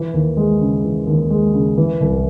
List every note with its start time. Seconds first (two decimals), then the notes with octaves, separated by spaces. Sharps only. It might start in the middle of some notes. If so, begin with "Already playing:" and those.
Already playing: E3
0.13 D#2
0.37 G#3
0.61 C#3
0.83 E3
1.07 D#2
1.30 G#3
1.54 C#3
1.78 E3
2.00 C2